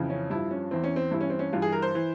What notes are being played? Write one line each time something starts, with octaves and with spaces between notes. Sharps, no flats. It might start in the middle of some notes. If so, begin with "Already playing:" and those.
Already playing: F2 C#3 E3
C#4
G2 F3 E4
C#4
E2 E3 C4
C#4
C4
G2 E3 E4
C#4
C4
C#4
G2 E3 F4
G#4
A#4
C5
E3